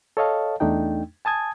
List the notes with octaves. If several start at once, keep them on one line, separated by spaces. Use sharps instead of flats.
A4 C#5 D#5 F5 A5
E2 A3 D4 D#4 G5
G#5 A5 D#6 G#6